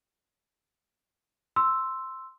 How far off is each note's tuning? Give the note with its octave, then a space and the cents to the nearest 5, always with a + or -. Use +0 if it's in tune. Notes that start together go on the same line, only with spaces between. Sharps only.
C6 +0 E6 +0